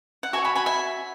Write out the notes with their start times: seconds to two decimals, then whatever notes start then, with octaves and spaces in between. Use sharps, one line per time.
0.23 F#5
0.33 F#4 A4 E5 G#5
0.38 C#5
0.44 G#5 B5
0.55 G#5 B5
0.66 E5 G#5